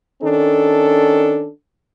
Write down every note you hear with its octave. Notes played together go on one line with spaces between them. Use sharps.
D#3 C#4 D4 A4